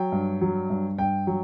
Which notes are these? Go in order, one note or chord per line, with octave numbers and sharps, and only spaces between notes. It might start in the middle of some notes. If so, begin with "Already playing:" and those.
Already playing: F#3 G5
G2
F#3
G2
G2 G5
F#3